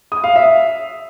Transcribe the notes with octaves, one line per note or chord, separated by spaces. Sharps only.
D#6
F5
E5